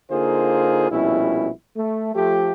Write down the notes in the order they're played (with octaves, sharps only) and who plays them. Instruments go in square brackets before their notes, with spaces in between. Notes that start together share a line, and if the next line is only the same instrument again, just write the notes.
[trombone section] D3 A#3 D#4 F4 G#4 C5
A#1 B2 G3 C#4 E4
A3
F3 A3 G4